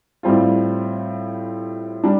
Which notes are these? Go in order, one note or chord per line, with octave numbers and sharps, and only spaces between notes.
A2 G3 C4 F4
G3 D4